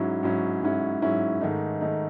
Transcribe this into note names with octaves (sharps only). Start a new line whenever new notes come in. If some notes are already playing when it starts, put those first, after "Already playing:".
Already playing: G#2 F#3 C#4 E4
G#2 F#3 C#4 E4
G#2 F#3 C#4 E4
G#2 F#3 C#4 E4
G#2 D#3 A3 D#4
D#3 A3 D#4